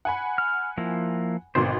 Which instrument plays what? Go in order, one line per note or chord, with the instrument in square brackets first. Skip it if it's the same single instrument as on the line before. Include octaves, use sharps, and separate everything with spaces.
[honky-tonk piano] F#5 G#5 B5
[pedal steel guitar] F6
F3 A#3 E4
[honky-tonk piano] G#1 B2 C6 [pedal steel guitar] D3 D4 C5